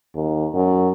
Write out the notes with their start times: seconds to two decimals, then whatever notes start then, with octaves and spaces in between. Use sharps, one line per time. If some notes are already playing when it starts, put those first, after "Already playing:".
0.15 D#2
0.54 F#2